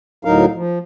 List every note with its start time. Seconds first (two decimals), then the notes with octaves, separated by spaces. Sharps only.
0.25 D2 A2 F#3 D#4 A#4 F5
0.55 F3